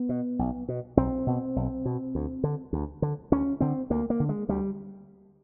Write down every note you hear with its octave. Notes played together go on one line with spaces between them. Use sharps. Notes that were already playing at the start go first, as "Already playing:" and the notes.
Already playing: B3
B2
B1
B2
B1 C4
B2
B1
B2
D2
D3
D2
D3
D2 C#4
D3 C4
D2 A#3
A#3
D3
G#3
D2 G3